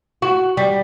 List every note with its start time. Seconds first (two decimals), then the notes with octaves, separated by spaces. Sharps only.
0.22 F#4
0.57 G3